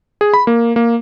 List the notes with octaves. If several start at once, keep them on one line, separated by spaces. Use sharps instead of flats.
G#4
B5
A#3
A#3